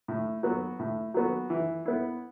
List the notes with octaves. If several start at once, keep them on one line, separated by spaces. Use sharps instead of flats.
A2
F#3 B3 F#4
A2
F#3 B3 F#4
E3
B3 E4